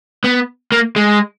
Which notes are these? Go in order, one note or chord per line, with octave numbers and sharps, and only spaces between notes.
B3
A#3
G#3